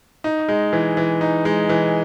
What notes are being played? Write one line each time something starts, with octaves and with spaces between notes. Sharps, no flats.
D#4
G#3
E3
E3
D#4
G#3
E3